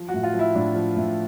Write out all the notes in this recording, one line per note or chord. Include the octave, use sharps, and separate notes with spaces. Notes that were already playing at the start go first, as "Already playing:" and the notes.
Already playing: F3
F#4
A2
F4
F3
E4
A2 D4
F3
A2